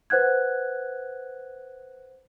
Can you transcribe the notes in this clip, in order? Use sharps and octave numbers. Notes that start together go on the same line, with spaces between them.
B4 C5 F#5 F#6 G#6